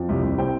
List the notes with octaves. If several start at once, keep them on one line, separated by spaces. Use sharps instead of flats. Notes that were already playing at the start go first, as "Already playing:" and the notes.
Already playing: F2
C2
C2
C4 G5